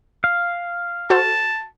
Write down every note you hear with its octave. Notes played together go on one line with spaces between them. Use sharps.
F5
F#4 A4 C5 A5